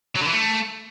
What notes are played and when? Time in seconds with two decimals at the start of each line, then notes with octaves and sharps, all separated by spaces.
0.16 F#3
0.22 D3
0.27 E3
0.33 A3